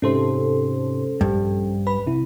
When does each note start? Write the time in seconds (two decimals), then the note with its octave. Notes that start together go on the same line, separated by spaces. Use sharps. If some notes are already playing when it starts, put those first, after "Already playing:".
0.02 G#2 C3 C#4 A4 C5 C6
1.21 A#1 G2
1.87 B4 B5
2.07 C3 E4